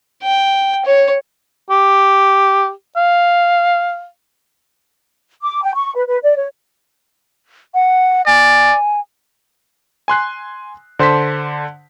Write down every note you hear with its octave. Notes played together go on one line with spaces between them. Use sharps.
G5
C#5
G4
F5
D6
G5
C#6
B4
B4
D5
C#5
F#5
D5 G#5
G#5 C6 F#6 C7
D3 C5 A5 C6 B6